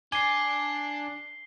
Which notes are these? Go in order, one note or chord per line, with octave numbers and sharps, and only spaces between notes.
D4 D5 G#5 D6 C7 G7